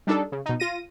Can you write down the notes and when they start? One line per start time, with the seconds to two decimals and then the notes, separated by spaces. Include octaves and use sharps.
0.07 G3 D4 D#4 A4
0.32 C#3
0.46 B2 D#4
0.60 F4 A#6 D#7